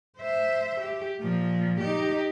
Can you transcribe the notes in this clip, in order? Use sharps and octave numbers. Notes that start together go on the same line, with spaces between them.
C5 E5
G4
A#2 F3
D#4 G4